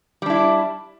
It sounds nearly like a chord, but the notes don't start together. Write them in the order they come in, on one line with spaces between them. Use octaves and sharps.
G3 D4 E4